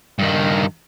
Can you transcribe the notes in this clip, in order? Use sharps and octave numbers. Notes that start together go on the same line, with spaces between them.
G2 D#3